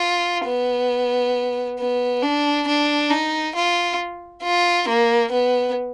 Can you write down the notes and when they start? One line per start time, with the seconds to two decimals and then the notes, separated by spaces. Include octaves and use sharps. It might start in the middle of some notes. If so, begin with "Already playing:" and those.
Already playing: F4
0.47 B3
1.80 B3
2.23 D4
2.68 D4
3.11 D#4
3.56 F4
4.44 F4
4.89 A#3
5.32 B3